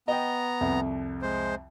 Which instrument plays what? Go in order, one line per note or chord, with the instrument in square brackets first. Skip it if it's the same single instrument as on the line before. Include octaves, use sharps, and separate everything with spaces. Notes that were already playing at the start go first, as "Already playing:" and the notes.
[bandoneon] B3 A#5 [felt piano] D#5 G5
[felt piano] C2 F2
[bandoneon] G#3 C5